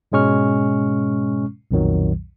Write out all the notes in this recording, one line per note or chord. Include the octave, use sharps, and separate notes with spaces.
G#2 B2 G#3 C#4 C#6 F6
B1 F2 A#2 D#3 F#3